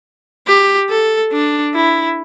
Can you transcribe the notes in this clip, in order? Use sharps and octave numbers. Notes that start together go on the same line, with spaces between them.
G4
A4
D4
E4